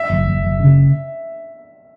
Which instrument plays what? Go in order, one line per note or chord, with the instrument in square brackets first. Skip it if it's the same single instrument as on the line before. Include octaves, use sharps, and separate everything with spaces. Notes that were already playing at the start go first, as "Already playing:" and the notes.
Already playing: [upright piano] E5
[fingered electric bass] F#1
F#1
F#1
C#3